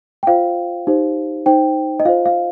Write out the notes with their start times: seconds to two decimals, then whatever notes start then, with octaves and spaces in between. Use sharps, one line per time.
0.23 G5
0.27 F4 C5 F5
0.87 D#4 G4 C5
1.46 D#4 C5 G5
2.00 D#5
2.05 F4 C5 F5
2.26 F5